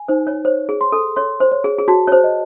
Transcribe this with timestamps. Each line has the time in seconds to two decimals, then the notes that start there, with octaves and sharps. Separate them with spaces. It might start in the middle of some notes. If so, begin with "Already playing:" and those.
Already playing: G#5
0.08 D#4 C5
0.27 C#5
0.45 C5 C#5
0.69 G#4
0.81 C6
0.92 A4
1.16 C#5 C6
1.40 C5
1.52 C#5
1.64 G#4
1.78 G#4
1.88 F#4 A5
2.07 C#5
2.12 C5
2.24 D#5